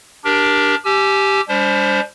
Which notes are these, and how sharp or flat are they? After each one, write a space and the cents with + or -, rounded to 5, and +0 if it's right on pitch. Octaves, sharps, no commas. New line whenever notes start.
D4 +0 G4 +0 A#4 +20
G4 +0 G#5 +35 E6 +35
G3 +30 D4 -40 C5 +5